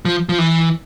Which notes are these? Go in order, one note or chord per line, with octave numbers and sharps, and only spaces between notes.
F3
F3
E3